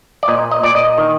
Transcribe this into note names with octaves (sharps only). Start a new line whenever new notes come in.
D5
A#2 D#5
D#5
A#2 D5
D#5
D#3